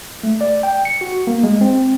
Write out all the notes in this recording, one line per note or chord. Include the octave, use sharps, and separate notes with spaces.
A3
D5
G5
C#7
F#4
A#3
G#3
C4